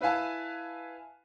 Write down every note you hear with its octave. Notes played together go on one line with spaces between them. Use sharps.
E4 B4 E5 F5 G#5 A5